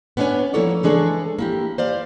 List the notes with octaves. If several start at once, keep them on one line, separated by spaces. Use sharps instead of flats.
B3 C#4 D4 E4 C#5 G#5
F3 A#3 E4 A4 C#5 D5
E3 G#3 D4 G#4 A4 C#5
A#3 E4 G4
C5 D5 F5